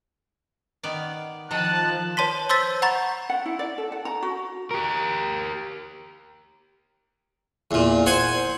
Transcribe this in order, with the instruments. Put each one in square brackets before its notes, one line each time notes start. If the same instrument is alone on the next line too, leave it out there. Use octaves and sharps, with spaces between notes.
[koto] D#3 B3 D5
[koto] D#3 A4 D#5 [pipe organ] F3 [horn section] A5 [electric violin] F#6
[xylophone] B4 C#5 A5 C6 B6
C5 C6 E6 G6 A6 B6
F#5 A#5 B5 C#6 G6 A6
[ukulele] F#5
E4
D5
A4
F#5
A#5
F#4
[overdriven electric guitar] G4 A#4
[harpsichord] E2 A#2
C5 F#5 G#5